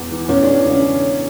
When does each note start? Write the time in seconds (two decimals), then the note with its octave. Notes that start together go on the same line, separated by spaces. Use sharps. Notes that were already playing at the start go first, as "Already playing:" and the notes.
Already playing: E2 E3
0.11 E3
0.28 E2 C#4
0.43 D4
0.47 E2
0.65 C#3 C#4